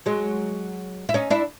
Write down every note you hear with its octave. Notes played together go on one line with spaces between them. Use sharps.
F#3 G#3
E4
C#4 D#4
D4 E4